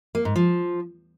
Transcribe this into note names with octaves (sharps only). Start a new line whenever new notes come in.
A#3
G#2
F3